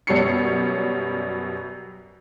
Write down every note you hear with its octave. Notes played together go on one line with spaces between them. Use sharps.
F#2 B2 G3 C#5 C7 C#7